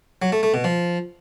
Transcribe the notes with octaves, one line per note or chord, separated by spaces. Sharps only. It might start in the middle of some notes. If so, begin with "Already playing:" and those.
F#3
A3
A3
B2
F3